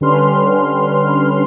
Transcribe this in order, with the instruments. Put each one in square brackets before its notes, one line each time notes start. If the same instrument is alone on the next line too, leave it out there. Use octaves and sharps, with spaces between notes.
[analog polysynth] D3 G3 C#4 B4 C6 F6